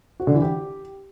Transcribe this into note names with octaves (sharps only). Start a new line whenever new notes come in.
F#4
D3
E3
G4